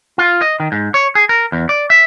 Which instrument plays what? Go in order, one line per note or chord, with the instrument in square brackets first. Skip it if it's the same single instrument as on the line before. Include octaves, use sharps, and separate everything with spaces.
[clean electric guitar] F4
D#5
D#3
G#2
C#5
G#4
A#4
E2
D5
E5